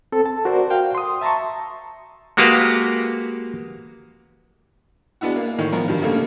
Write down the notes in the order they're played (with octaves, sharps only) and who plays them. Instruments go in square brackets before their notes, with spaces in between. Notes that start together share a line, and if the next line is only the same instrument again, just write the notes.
[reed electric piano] C4 A4
A5
F#4 A#4 C5 D5
F#4 F5 G5
C6 D#6
E5 A5 A#5 C6 C#6
[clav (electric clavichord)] G#3 A#3 F#4 G4 B4 F5
[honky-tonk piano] G#3 B3 D4 E4 F#4
A#3
A2 D#3
F3 B3 A#4
G2 D#3
G2 C#3 A3 A#3